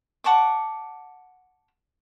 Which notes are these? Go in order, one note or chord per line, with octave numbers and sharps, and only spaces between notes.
F#5 A5 C#6 D6